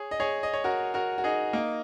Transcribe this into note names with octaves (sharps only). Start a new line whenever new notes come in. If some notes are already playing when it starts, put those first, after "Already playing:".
Already playing: G#4 C#5
D#5
G#4 C#5
D#5
C#5
F#4 A#4
F#4 A#4
F#4
D#4 G#4
A#3 D#4